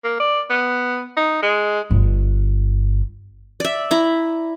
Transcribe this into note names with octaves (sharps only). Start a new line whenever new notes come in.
A#3
D5
B3
D#4
G#3
G1
D5 E5
E4 A#5